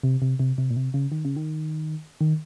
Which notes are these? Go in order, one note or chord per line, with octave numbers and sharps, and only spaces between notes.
C3
C3
C3
C3
A#2
C3
C#3
D#3
C#3
D#3
D#3